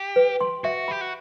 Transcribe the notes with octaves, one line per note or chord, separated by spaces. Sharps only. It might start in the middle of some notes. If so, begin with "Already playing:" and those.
Already playing: G4
B4
C6
F#4 E5
G4 B5
F#4